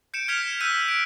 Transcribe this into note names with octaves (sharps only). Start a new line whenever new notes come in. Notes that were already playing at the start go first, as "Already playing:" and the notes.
G6 C#7 D7 E7
F6 G#6 B6 C#7 E7 F7
E6 F#6 G6 B6 D#7
D7